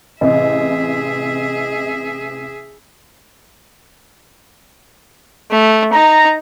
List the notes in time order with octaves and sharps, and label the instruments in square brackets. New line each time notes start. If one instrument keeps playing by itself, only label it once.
[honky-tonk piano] A1 C3 [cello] G#4 E5 [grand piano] D#5
[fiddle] A3
[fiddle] D#4 [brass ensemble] A#5